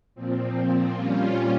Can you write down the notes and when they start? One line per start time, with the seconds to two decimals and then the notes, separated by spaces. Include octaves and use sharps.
0.15 A#2 F3 C4
0.93 A#2 G3 C#4 F4